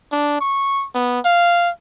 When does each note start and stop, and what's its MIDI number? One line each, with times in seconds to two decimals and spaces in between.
0.12 0.40 62
0.41 0.86 85
0.94 1.20 59
1.25 1.70 77